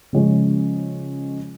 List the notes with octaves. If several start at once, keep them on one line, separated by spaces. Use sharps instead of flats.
C#3 F3 G#3 C#4